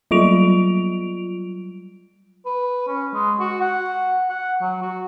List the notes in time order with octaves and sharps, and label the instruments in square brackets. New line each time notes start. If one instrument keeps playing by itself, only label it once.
[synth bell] F#3 G3 F4 D7 F7
[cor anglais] B4
C#4
G#3
F#4
F#5
F#5
F#3
F#4